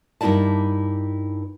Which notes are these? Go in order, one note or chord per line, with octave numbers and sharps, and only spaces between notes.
G2 A#3 D#4 E4 D5 A5